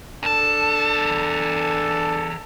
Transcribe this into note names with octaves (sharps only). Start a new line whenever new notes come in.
E2 D4 A4 A5